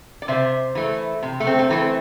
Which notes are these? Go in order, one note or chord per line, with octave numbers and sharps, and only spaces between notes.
D5
C3 C5 E5
E3 A3
C3
A3
C4
A3
E3 A3 C4